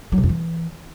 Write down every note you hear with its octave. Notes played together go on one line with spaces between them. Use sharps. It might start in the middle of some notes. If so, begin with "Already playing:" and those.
F#3
C3
F2
E3